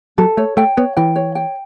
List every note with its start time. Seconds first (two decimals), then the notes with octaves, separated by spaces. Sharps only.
0.18 F#3 A4
0.37 A3 C#5
0.57 A3 G5
0.77 B3 C#5
0.97 E3 G5
1.16 C#5
1.35 G5